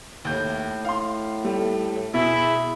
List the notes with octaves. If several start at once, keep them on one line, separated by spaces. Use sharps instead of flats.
D#2 A2 G6
F5 C6
G3 A3
B2 E4 G#4 E5